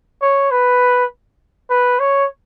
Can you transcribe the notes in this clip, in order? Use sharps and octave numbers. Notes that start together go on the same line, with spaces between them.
C#5
B4
B4
C#5